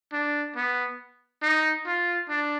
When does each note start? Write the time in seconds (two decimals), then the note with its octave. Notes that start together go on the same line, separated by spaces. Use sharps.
0.13 D4
0.56 B3
1.43 D#4
1.86 F4
2.29 D4